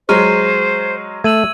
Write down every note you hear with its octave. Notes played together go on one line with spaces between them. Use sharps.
F#3 G#3 C5 C#6 F6 D#7
A3 E6 G#6 D#7 F#7